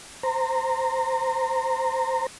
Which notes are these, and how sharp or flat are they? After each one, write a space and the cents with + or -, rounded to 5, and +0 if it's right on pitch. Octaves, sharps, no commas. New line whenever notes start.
C5 -10 A#5 -20